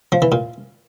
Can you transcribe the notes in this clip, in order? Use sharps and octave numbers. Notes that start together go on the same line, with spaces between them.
F3
E3
A#2